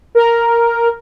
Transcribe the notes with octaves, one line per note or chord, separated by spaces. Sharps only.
A#4